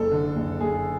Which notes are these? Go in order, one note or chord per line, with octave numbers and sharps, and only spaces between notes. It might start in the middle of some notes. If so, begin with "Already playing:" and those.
Already playing: F#1 A4
D3
F#1
F#1 G#4